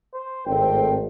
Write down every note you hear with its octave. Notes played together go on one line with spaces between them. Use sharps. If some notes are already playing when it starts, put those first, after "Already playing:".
C5
G#1 A2 C4 G5